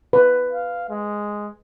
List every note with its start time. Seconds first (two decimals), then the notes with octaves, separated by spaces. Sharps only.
0.13 B4
0.53 F5
0.90 G#3